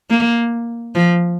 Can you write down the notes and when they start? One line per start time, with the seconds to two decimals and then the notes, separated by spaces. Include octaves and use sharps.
0.10 A#3
0.95 F3